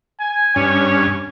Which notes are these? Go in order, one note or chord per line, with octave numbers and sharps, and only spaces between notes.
G#5
G2 C#4 C#5